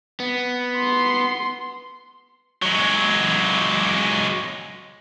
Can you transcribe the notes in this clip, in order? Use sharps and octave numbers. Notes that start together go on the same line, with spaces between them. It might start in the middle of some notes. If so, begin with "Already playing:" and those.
B3
C6
F#3 G#3